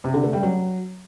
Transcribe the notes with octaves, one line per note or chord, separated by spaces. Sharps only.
C3
D3
A3
G3
F#3